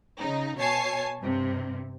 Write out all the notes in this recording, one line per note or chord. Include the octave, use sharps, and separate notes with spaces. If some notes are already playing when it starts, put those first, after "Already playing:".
C#3 D#4
B2 C#5 G#5 A5 C7
G2 C3